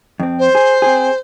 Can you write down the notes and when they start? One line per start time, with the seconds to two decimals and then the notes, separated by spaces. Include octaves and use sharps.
0.20 F2 C4
0.39 C5
0.55 G#4
0.82 C4 G#4